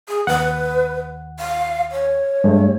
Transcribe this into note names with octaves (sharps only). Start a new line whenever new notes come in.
G#4
D#2 B4 F#5
F5
C#5
G2 G#3 A3